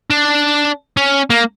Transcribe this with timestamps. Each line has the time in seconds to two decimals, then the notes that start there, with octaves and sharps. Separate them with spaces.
0.10 D4
0.97 C#4
1.30 A#3